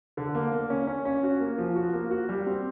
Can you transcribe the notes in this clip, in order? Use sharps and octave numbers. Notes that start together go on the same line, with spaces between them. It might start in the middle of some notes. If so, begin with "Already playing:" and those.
D3
A#3
A#3
C#4
C#4
C#4
F#4
A#3
F3
F#4
A#3
F#4
G3
C4